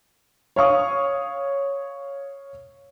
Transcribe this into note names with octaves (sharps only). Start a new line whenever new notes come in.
C#5 F5 C#6 D#6